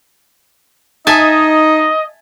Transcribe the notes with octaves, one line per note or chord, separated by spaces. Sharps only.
D#4 D#5 E5 G#5 A5